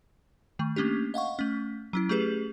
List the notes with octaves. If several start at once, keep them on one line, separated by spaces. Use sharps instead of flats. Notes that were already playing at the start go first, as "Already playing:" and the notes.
D#3 A3
A3 A#3 C#4 D4 G4
D#5 F5 F#5 C#6
A3 C#4
F#3 C#4 E4
A3 C#4 G4 G#4 B4